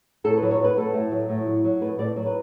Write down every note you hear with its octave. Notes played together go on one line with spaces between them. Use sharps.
A2 A4
B4
F#3
C#5
F#3 B4
A2 A4
A2
F#3
A2
F#3
F#3
A2 B4
A2 D5
F#3 C#5
B4